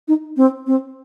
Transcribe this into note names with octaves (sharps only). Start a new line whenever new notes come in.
D#4
C4
C4